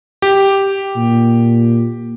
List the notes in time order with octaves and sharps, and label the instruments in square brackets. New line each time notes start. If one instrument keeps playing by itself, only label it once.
[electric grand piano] G4
[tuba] A#2